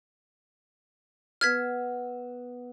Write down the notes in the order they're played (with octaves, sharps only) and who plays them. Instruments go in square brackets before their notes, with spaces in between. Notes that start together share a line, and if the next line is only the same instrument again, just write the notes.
[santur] B3 E6 [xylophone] F6 G#6 B6